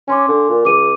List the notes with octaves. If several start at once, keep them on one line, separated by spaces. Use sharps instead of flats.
C#4 G#5 C6 D6
D3
A#2
C#2 D6 D#7